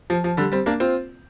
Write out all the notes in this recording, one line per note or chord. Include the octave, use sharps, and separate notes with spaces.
F3
F3
D3 G3
G3 C4
A#3 D4
C4 F4